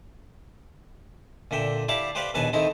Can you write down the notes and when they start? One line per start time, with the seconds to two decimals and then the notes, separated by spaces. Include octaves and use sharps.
1.51 A#2 D3 E5 G5
1.89 E4 G4 D5 F5 A5 D6
2.15 G4 B4 C5 D5 F5 G5
2.34 A#1 D#2 B2 B4 G#5 A5
2.53 D#3 C4 D#4 E4 A4